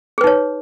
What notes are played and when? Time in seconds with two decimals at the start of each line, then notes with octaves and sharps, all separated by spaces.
0.18 G#4
0.21 B4
0.24 D#4
0.27 C#5